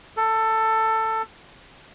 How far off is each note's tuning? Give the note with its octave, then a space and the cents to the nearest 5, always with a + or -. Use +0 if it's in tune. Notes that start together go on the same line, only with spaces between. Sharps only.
A4 +15